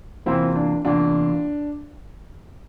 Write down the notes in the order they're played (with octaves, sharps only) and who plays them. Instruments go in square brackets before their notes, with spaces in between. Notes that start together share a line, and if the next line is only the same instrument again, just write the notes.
[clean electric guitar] E2 C3 E3 A#3 F4 [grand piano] C4 E4
[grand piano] D4
[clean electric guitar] E2 C3 E3 A#3 F4 [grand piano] D4